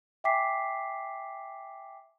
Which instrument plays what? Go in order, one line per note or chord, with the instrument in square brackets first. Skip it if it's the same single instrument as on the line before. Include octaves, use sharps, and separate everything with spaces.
[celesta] E5 G5 G#5 D6 B6 C7